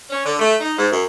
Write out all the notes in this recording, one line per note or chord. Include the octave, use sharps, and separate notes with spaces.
C#4
D3
A3
D#4
G#2
F#2